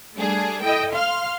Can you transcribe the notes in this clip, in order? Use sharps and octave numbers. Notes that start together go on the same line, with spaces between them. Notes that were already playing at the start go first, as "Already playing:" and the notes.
G3 A3 D4 G#4
E4 A4 D#5 G5
F5 C6 F6